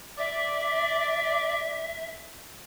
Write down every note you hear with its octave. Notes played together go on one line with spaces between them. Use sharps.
D5 E5